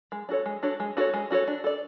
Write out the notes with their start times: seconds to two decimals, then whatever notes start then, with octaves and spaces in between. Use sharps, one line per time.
0.12 G#3
0.29 D4 F#4 A4 C#5
0.46 G#3
0.63 D4 F#4 A4 C#5
0.80 G#3
0.97 D4 F#4 A4 C#5
1.14 G#3
1.31 D4 F#4 A4 C#5
1.48 D4
1.64 A4 D5